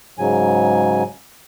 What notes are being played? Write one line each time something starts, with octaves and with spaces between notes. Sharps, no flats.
G#2 C#3 F#3 G#5